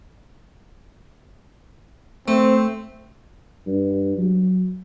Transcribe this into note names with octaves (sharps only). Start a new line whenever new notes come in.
A3 C4
G2
F#3